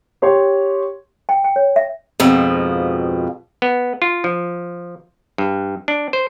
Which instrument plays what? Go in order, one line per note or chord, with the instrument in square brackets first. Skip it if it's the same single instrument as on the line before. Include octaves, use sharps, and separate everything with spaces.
[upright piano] G4 C#5 C6
[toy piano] G5
G5
C#5
E5
[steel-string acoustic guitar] F2 G#2 B2 F3
[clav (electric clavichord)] B3
F4
F3
G2
D4
C5